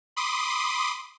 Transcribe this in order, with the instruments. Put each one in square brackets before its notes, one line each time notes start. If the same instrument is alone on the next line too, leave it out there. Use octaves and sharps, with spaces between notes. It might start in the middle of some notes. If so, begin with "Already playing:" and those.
[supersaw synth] B5 C6 D6 D#6